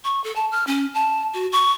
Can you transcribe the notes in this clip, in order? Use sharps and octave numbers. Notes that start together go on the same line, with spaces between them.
C#6
A4
A5
F6
C#4
A5
F#4
C#6